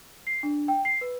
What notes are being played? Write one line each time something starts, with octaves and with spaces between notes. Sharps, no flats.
C7
D4
G5
C7
B4